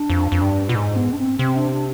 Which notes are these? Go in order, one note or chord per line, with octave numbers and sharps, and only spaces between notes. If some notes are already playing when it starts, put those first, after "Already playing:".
Already playing: D4
F2
F2
G2
B2 F4
G#2 D#4
B3
D4
C4
C3 C4
D4
D4